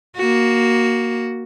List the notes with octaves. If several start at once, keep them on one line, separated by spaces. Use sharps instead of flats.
A#3 F#4